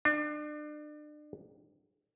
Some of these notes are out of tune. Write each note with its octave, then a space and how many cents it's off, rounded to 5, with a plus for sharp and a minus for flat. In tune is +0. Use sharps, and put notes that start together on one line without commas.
D4 +35